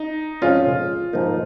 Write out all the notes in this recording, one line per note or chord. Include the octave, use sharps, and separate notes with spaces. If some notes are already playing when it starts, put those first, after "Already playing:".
Already playing: D#4
F2 F3 G#3 C#4 F4
G#2 F3 A#3 D#4